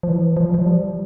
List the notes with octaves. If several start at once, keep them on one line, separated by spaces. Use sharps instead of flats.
F3
E3
F3
F3
G3